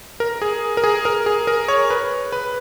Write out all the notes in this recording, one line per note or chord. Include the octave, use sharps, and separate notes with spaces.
A#4
G#4
A#4
G#4
A#4
G#4
A#4
C#5
B4
B4